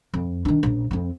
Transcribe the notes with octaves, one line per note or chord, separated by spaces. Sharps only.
F2
D#3 D4
A#1 F#2
F2 C4